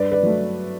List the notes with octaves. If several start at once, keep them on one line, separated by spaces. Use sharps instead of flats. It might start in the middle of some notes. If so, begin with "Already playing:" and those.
Already playing: G2 B4 D5
B4 D5
F#3 A3